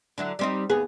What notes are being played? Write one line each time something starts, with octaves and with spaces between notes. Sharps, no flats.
D3 F#3 E4
G3 C4 D#4
D#2 B3 G#4